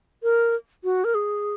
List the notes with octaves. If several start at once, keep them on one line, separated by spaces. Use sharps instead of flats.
A#4
F#4
A#4
G#4